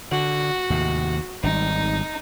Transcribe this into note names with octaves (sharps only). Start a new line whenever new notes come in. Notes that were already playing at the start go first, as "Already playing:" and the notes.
D3 F#4
D#2 A2 C3
G#1 G3 D#4